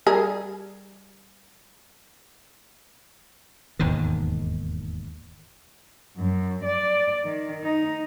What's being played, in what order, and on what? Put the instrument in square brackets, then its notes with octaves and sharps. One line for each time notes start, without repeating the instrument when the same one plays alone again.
[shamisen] G3 G#4 A#4
[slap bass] E1 D#2 G#2 D#3
[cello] F#2
D5
D#3
D#4